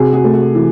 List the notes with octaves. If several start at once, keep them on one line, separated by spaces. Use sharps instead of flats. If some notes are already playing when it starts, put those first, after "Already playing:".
Already playing: C3 F#4 G#4
F#4 G#4
A3
F#4
E3